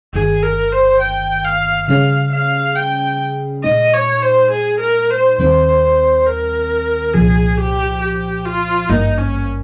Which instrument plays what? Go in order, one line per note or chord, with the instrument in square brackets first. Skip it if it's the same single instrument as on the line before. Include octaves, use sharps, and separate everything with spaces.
[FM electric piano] G1 G2 D#3 [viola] G#4
[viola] A#4
C5
G5
F5
[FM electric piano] C#3 G3 C#4 G#4 [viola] F5
[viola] F5
G5
[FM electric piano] A#2 G#3 D#4 [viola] D#5
[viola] C#5
C5
G#4
A#4
C5
[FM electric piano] D#2 D#3 G3 C4 [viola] C5
[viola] A#4
[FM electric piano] C2 A#2 F3 [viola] G#4
[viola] G4
G4
F4
[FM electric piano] G#1 G2 G3 A#3 [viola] D#4
[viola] C#4